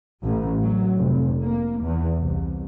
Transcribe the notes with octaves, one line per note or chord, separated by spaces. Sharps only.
A1
F#3
F1
A#3
E2
C2